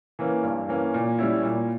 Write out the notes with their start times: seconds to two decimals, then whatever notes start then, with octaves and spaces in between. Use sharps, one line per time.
0.19 E3 A#3 C#4
0.44 G2
0.69 E3 A#3 C#4
0.94 A#2
1.19 G3 C#4 E4
1.43 A#2